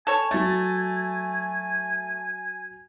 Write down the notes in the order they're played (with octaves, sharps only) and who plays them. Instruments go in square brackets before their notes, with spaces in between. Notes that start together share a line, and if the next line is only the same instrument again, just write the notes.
[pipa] A4 C#5 [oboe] G#5
[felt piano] F#3 A6 [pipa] A3